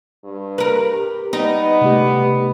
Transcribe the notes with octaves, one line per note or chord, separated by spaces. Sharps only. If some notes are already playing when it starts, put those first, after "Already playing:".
G2
A#4 B4
G4
G3 B3 D#4
C3 A3 G4